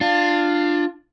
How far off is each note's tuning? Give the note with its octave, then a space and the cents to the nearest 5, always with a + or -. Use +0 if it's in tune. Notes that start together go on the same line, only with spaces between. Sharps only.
D4 +20 F4 +0